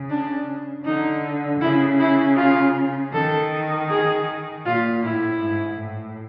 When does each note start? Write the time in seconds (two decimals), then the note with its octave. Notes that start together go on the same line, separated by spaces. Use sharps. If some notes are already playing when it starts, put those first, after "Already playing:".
Already playing: C#3
0.10 D4
0.85 D3 D#4
1.61 C#3 E4
1.99 E4
2.37 F4
3.13 D#3 A4
3.89 G#4
4.65 A#2 F4
5.03 A2 E4
5.41 G#2
5.79 A2